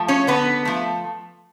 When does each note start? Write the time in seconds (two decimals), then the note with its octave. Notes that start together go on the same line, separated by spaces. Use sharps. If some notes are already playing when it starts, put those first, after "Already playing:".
Already playing: F3 A3
0.08 C#4 C#5
0.27 D3 B3 B4
0.65 F3 A3